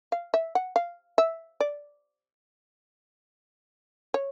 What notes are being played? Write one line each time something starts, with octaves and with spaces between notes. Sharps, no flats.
F5
E5
F#5
F5
E5
D5
C#5